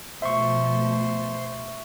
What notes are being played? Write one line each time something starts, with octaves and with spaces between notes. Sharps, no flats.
B2 F3 A3 C5 E5 C6 C#6